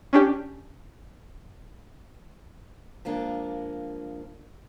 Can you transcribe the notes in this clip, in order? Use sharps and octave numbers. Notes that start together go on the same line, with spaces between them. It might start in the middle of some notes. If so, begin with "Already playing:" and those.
C#4 D4 G4
F3 G#3 A#3 D4